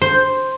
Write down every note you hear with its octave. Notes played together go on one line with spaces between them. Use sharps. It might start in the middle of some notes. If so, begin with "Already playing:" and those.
C5